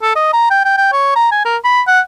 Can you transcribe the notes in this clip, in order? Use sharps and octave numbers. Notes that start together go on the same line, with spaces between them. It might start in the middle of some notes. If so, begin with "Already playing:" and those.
A4
D#5
A#5
G5
G5
G5
C#5
A#5
G#5
A#4
B5
F#5